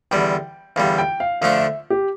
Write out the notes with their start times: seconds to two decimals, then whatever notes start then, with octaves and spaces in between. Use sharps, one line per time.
0.11 E2 D3 G3 G5
0.76 E2 D3 G3 F5
0.98 G5
1.20 F5
1.41 D3 F3 A3 D4 F5
1.58 E5
1.90 G4